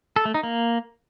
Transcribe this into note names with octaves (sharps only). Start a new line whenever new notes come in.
A4
A3
D#4
A#3